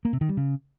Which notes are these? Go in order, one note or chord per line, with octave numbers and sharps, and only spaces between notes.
A#3
C3
D#3
G3
C#3